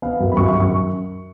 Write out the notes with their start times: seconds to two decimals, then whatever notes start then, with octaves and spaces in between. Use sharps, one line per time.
0.02 B3 F5
0.20 F#2
0.32 B5
0.37 F#2 C#6
0.49 C#6
0.55 F#2
0.60 C#6